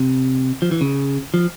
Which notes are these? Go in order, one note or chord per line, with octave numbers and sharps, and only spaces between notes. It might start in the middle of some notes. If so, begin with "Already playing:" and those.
Already playing: C3
F3
E3
C#3
F3